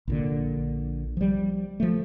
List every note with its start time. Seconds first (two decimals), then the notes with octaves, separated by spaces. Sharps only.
0.08 A#1 A#2 D3
1.17 F3 G3
1.80 F3 A3